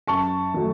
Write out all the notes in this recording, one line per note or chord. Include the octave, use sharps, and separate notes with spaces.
F#2 A5 C#6
D#3 F#3 A3